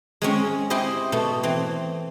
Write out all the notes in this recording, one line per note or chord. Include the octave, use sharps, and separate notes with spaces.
G#3 C4 C#4
C4 E4 G4 C5 D#5
B2 A3
E3 C4